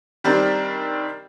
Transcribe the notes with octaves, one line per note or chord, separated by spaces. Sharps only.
D#3 G3 C4 D4 G4 A#4